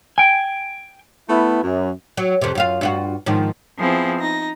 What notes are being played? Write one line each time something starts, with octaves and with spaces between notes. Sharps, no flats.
G5 G#5
A3 B3 E4
F#2
F#3
F2 C3
F#2 F4 F5
G2 F4 F#4
G#2 D#3 F3
F3 B3 C4 E4 G#4
D#4 A#6